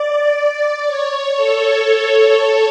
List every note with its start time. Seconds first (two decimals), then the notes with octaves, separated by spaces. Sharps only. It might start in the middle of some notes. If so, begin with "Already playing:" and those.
Already playing: D5
0.86 C#5
1.36 A4